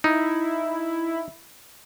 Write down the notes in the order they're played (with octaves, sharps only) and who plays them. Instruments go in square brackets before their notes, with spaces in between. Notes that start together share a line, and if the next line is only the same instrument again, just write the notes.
[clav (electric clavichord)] D#4 [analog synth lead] E4